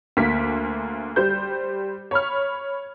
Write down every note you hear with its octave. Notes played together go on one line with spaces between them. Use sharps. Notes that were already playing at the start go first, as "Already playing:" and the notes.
D2 A#3 B6
G3 C5 G6
C#5 B5 F6